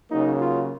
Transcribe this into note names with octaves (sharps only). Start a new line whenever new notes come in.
C#3 F#3 A#3 D#4
F4